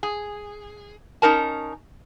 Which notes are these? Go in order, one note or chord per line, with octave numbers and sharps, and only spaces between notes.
G#4
C#4 D#4 A#4 A5